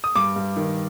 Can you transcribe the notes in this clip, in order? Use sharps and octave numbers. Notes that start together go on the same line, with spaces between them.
D#6
G2 D6
G2
D#3